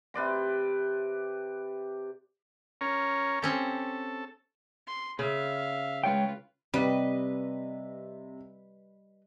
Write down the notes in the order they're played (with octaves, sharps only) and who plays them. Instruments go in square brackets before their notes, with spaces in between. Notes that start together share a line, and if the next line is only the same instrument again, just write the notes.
[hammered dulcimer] C3 B4 D5 C6
[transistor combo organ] C#4 A#4 C#5
[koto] C4 C#4 G4 [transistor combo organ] A4
[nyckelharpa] C6
[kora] C#3 [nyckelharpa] E5 F5
[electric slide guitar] G#3 C#5 G5 [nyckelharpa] F4 B4
[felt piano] C3 [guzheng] G3 [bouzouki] B4 D#5